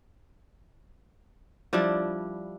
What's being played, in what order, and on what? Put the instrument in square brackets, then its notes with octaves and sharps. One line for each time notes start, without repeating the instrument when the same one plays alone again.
[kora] F3 G3 D4 E4